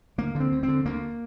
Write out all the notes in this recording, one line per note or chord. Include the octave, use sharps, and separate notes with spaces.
D2 A#3
D3
C4
D2
C4
D3
D2 A#3